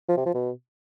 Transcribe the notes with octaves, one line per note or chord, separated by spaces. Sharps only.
F3
C3
F3
B2